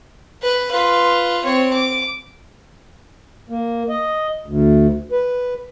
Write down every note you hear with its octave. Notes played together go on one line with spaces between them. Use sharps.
B4
F4 B4
C4 C#5
D6
A#3
D#5
D2
B4